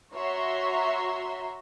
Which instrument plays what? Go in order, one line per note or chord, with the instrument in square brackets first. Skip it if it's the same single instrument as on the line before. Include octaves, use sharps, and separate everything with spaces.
[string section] F#4 C#5 E5 A#5 C6